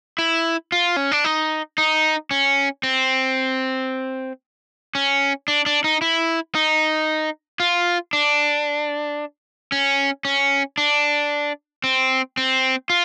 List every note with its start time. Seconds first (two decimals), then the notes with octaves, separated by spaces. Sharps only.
0.18 E4
0.72 F4
0.96 C#4
1.12 D4
1.24 D#4
1.78 D#4
2.31 C#4
2.83 C4
4.95 C#4
5.48 D4
5.66 D4
5.84 D#4
6.02 E4
6.55 D#4
7.60 F4
8.13 D4
9.72 C#4
10.25 C#4
10.78 D4
11.84 C4
12.37 C4
12.90 F4